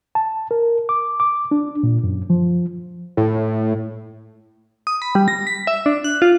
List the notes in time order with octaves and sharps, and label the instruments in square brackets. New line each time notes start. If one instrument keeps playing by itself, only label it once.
[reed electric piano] A5
A#4
D6
D6
D4
A#2
F#2
F3
[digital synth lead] A2
D#6
B5
G3
A#6
B6
E5
D4
F#6
F4